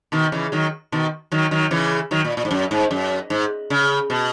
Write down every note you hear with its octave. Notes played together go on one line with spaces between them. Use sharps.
B2 D#3
C#3 E3
D#3 F#3
B2 D#3
D#3 F#3
D#3 F#3
C#3 E3
D#3 F#3
A#2
A#2
G#2
F#2
G#2
F#2
G#2
C#3
B2